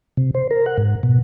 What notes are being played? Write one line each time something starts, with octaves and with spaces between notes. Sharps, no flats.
C3
C5
A#4
F#5
G#2
B2